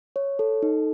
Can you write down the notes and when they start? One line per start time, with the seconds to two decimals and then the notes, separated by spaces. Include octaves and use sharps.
0.16 C#5
0.39 A4
0.63 D#4